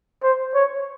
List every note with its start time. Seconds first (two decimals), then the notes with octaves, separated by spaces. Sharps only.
0.23 C5
0.55 C#5